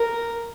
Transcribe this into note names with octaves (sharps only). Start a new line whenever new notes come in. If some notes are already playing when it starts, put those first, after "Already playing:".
Already playing: A#4